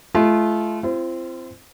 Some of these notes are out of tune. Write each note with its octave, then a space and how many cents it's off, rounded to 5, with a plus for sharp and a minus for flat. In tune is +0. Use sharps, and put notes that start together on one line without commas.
A3 -35 F4 -30
C4 +0 F4 -45